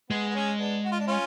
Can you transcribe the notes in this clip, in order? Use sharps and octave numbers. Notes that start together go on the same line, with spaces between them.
G#3 B3
B3
C#4
B3 D4
F#4
F4
D4
C#4 F4